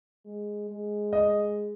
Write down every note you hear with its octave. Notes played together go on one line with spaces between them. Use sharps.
G#3
G#3
D#5